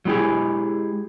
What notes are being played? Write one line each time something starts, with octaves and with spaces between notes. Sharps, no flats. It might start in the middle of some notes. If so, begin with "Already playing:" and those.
F#3 G#3 E4 G4 G#4